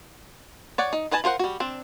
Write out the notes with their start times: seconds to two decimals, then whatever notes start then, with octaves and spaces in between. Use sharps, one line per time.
0.78 C#5 D5 F#5
0.93 D#4
1.11 D#4 B4 D#5 G#5 A5
1.24 F4 A#4 C5 F#5
1.39 G3 F#4
1.60 C4 D4